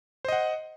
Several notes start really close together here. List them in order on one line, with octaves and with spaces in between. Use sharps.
C5 D#5 F#5